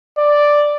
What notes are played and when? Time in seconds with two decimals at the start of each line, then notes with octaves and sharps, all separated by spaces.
0.18 D5